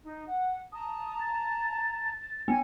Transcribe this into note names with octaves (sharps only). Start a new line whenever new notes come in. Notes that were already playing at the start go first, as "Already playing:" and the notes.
D#4
F#5
A5 A#5 D#6
A6
B3 C#5 G#5 C#7